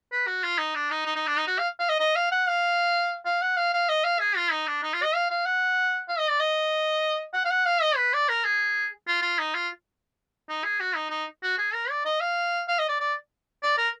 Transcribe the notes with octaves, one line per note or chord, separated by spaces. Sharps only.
B4
F#4
F4
D#4
D4
D#4
D#4
D#4
D4
D#4
F#4
F5
F5
D#5
D#5
F5
F#5
F5
F5
F#5
F5
F5
D#5
F5
G#4
F4
D#4
D4
D#4
F4
D#5
F5
F5
F#5
F5
D#5
D5
D#5
F#5
F5
F#5
F5
D#5
B4
D5
A#4
G#4
F4
F4
D#4
F4
D#4
G#4
F#4
D#4
D#4
F#4
G#4
A#4
D5
D#5
F5
F5
D#5
D5
D5
D5
A#4